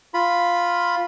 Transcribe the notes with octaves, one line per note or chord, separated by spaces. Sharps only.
F4 B5